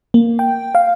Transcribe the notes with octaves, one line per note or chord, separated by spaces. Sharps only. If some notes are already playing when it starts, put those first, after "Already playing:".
A#3
G5
F5